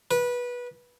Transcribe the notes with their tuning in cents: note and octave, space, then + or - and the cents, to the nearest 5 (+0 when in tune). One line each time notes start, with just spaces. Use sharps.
B4 -20